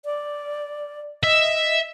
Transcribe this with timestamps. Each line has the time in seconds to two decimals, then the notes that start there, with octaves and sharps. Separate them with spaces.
0.05 D5
1.23 D#5 E5